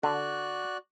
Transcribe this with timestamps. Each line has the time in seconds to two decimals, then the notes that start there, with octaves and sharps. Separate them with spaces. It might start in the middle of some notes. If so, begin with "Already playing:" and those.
0.03 D3 F#4 D5 F#6